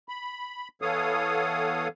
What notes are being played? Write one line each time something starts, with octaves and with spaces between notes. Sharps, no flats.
B5
E3 B3 A4 C#5 F5 D#6